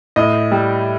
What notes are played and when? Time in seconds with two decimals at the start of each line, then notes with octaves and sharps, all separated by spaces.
0.16 A2 D#5
0.52 G3